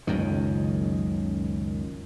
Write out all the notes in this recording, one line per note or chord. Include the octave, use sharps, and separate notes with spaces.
F#1 C#2 F#2 D#3